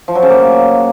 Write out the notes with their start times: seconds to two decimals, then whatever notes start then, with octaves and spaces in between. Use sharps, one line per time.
0.08 F3
0.15 F#3
0.23 C#3
0.30 A#3